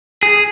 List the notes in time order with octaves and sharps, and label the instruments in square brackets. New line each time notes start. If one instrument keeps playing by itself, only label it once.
[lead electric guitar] G#4